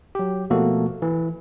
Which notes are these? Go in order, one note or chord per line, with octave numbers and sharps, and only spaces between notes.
F#3 G4
B2 F3 A3 A#3 F#4 A4
E3